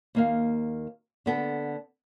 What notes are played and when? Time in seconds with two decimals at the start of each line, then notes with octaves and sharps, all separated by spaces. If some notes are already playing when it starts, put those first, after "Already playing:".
0.15 D#2 A#3 F5
1.26 D3 B3 A4